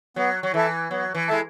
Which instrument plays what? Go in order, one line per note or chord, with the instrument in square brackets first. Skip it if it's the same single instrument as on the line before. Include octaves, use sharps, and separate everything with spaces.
[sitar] F#3 [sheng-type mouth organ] B3
[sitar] F#3
[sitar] E3 [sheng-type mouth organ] E4 A4 E5 A5
[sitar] F#3 [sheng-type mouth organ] B3
[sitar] E3
[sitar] G#3 [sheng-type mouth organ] E4 A4 E5 A5